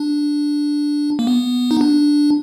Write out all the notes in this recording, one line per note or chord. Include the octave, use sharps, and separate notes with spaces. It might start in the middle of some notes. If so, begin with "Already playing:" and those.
Already playing: D4
A#3
B3
D#4
D4